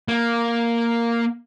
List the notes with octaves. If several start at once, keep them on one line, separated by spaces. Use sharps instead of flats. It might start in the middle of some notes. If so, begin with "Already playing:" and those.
A#3